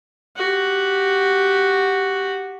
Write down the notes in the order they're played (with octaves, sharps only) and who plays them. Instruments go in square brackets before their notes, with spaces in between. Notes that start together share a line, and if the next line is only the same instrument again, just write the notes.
[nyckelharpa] F#4 G4